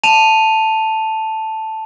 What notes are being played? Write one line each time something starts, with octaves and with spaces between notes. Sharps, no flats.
A5 D#7 F7